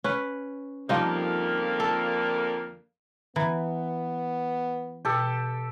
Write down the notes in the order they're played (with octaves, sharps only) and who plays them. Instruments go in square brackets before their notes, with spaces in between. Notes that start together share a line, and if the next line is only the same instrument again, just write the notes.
[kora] C#4 B4
[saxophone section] F2 D3 A#3 [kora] F3 G3 D#4
[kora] A4
[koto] E3 [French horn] B3 [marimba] A#5
[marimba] B2 [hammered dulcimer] G4 A4